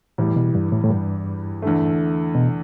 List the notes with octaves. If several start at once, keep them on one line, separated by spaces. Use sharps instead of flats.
E2 A2 E3 G3
B2
G2
A2
A2
G2
E2 D3 A3
B2